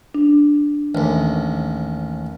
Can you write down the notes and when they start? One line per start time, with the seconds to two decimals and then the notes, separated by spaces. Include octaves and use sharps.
0.15 D4
0.95 A1 D#2